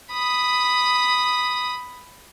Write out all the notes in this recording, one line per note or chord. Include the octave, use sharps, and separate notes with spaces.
B5 D#6